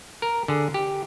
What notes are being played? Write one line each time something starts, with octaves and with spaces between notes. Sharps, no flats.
A#4
D3 G#4
G4